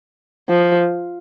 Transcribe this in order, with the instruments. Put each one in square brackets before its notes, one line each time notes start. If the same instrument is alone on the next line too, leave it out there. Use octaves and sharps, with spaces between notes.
[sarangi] F3